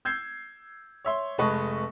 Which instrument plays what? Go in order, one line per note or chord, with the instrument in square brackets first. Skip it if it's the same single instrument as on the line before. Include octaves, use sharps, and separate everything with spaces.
[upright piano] E6 G6 G#6 C7
C#5 E5 C6
F1 G#3 A4 B4 D#5 C#6